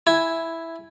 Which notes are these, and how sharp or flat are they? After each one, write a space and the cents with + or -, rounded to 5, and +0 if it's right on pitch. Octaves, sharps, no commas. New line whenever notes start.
E4 +0 G#5 -5